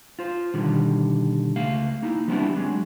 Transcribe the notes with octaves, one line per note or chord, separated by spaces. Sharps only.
F4 C5
B2 D3 D#3 G3
C#2 A3 F5
A#3 D#4 E4
F3 G3 B3 C4 D4 E4
F#3 G#3 D4